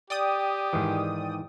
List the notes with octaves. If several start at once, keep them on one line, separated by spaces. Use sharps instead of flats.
G4 D5 G5 D#6
G#2 D#3 E3